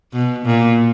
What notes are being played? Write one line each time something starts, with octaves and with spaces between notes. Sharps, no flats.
B2
A#2